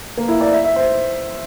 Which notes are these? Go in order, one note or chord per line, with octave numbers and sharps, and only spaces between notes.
A#3
E4
D5
E5
E5
C5